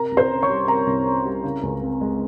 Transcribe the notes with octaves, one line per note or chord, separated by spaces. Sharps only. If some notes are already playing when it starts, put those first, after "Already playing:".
Already playing: C3 A#4 A#5
C2
C5 C6
C#4
C#5 C#6
G3
C3 A#4 A#5
C2
C#4
G3
C#3
C#2
C4
G#3